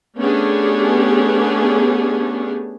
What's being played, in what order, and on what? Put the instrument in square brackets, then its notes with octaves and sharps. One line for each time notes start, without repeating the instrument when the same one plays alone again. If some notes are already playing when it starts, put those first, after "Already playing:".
[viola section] A3 B3 C#4 D4 G4 G#4